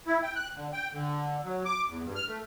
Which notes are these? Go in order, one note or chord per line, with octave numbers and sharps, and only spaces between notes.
E4
G5
F#6
D3
G5
D3
F#3
D6
E2
G2
F6
A3